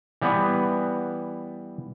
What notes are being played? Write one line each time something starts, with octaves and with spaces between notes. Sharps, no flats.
E3 G3 B3